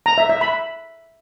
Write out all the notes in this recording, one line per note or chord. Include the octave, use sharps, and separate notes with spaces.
A#5
E5
E5
B5